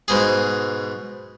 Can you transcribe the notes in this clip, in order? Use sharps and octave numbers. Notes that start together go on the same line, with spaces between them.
G#2 B2 G#4